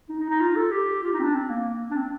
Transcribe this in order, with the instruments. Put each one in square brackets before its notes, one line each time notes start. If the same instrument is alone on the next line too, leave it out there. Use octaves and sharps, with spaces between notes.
[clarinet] D#4
D#4
D#4
F4
A4
G4
F4
D#4
C4
D4
C4
A#3
D4
C4